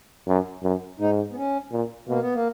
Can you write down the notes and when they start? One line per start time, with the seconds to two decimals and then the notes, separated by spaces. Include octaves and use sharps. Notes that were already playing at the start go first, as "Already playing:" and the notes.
0.28 F#2
0.63 F#2
1.00 G#2 D#4
1.31 B3
1.36 C#4
1.72 A#2
2.07 B2 A#3
2.21 B3
2.34 A#3